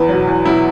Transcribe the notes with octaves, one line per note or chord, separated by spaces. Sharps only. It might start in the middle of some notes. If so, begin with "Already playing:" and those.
Already playing: E2 B4
B2 F#3
E2
B2 F#3 E4